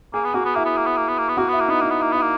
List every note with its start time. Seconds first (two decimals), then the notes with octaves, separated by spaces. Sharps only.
0.14 A#3 G#4
0.25 B3
0.34 A#3 F#4
0.45 B3
0.55 A#3 E4
0.65 B3
0.77 A#3
0.86 B3
0.97 A#3
1.08 B3
1.18 A#3
1.29 B3
1.37 A#3 F#4
1.48 B3 E4
1.60 A#3
1.68 B3 D#4
1.81 A#3 D#4
1.90 B3
1.99 A#3 E4
2.12 B3 E4
2.21 A#3